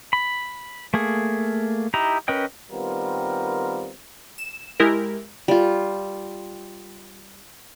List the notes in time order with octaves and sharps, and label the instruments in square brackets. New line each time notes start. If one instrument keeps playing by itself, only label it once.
[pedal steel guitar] B5
A3 A#3 G#4
D#4 E4 G4 A#5
C#4 A#4 B4 D#5 G5
[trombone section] D#3 G3 B3 C4 F4 A#4
[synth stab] E7
G#3 E4 G4 A#4
[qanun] G3 F4